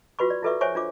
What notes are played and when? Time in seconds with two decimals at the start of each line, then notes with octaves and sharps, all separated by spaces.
0.19 F4 F#4 B4 B5 C#6
0.30 D5
0.43 E4 F4 A4 B4 E5 C#6
0.61 C5 C#5 E5 G#5 C#6
0.75 D4 F4 D6